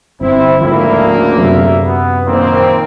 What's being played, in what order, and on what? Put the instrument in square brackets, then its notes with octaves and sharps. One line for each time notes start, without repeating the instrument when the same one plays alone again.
[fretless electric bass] G1 [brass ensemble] C4 E4
[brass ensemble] D2 C#3 A#3 [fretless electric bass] G#2 F3 [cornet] E4
[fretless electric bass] F#2 C3 F#3 [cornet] E5
[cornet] B3
[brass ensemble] A#1 D#3 C4 [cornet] A#3